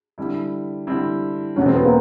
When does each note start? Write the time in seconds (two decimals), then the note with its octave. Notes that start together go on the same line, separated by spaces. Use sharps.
0.18 D3 G3 C4 E4
0.87 D3 G3 C4 E4
1.56 E1 E2 B2 F#3 A3 C#4
1.66 C4
1.75 B3
1.85 A#3 C4